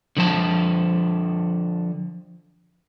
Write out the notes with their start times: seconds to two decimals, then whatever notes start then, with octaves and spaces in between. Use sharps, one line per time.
0.17 D3 F3 A5